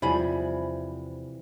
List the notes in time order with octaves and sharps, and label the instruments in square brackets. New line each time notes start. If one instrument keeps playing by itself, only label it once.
[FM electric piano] E2 [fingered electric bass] C3 E3 [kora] F3 G3 [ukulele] E4 G#4 B5